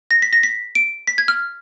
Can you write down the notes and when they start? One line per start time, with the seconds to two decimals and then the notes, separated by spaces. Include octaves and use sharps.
0.11 A#6
0.22 B6
0.33 A#6
0.43 B6
0.75 D7
1.07 B6
1.18 G#6
1.28 F6